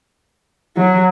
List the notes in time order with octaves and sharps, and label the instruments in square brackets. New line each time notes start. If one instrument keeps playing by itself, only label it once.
[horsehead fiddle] F#3